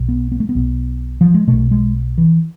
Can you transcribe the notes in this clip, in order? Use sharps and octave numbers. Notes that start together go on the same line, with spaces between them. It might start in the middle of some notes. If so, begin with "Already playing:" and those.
Already playing: B1 B2
B3
B3
A3
B3
B1 B2
F3
G#3
B1 B2 A3
G#3
E3